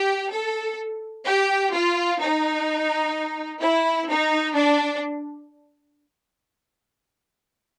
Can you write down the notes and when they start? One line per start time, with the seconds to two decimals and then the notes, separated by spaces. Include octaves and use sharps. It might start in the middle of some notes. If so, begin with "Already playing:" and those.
Already playing: G4
0.32 A4
1.27 G4
1.74 F4
2.21 D#4
3.62 E4
4.09 D#4
4.56 D4